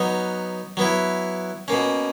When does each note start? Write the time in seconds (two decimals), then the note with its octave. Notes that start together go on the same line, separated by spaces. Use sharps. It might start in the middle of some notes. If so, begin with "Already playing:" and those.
Already playing: F#3 B3 D#4
0.77 F#3 B3 E4
1.68 B2 A#3 C#4